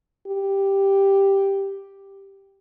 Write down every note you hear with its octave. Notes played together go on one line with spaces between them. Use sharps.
G4